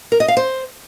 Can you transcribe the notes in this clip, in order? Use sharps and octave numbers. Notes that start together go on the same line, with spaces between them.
A#4
D#5
F5
C5